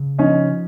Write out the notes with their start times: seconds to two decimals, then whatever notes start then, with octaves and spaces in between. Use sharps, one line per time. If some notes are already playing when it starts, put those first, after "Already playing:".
Already playing: C#3
0.18 F3 C#4 D#4